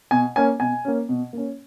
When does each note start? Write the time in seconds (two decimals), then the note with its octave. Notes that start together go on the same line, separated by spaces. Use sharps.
0.11 B2 G#5
0.36 A#3 C#4 G#5
0.60 B2 G#5
0.85 A#3 C#4
1.09 B2
1.33 A#3 C#4